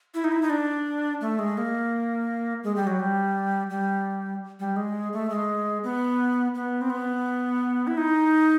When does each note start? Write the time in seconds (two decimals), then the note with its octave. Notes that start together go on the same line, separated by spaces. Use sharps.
0.14 E4
0.24 D#4
0.32 E4
0.42 D#4
0.50 D4
1.21 A3
1.39 G#3
1.58 A#3
2.64 G#3
2.76 G3
2.87 F#3
2.99 G3
3.70 G3
4.60 G3
4.76 G#3
5.13 A3
5.30 G#3
5.84 B3
6.54 B3
6.81 C4
6.90 B3
7.87 E4
7.97 D#4